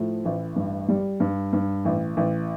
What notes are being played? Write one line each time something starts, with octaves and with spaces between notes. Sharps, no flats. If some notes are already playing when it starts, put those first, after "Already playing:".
Already playing: A2 F3
A1
G2
G3
G2
G2
A1
A1